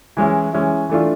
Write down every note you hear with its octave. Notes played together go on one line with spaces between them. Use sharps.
E3 G#3 C#4 E4
E3 G#3 C#4 E4
E3 A3 D4 F4